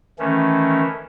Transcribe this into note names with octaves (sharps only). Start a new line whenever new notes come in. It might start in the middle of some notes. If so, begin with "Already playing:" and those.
D#3 E3 A3 C#4